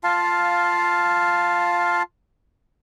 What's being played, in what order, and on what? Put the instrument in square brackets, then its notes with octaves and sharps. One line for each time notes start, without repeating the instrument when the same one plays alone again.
[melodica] F4 F5 A5